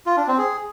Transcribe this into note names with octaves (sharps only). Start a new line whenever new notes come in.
F4
D4
C4
G#4